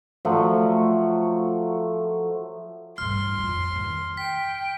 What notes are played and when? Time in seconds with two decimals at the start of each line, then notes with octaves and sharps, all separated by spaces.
0.25 F3 F#3 A3
2.98 A1 G2 C6 F6
3.38 F2 F4
3.76 D#3
4.17 G5 B6